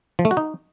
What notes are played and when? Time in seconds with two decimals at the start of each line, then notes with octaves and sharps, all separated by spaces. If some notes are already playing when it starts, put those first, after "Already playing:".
0.19 F3
0.25 A3
0.31 F#4
0.37 D#4